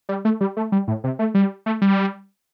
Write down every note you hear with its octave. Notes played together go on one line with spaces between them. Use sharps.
G3
A3
G3
A3
G3
A2
C3
A3
G3
A3
G3